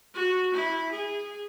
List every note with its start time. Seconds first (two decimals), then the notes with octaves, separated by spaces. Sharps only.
0.14 F#4
0.54 E4
0.92 G#4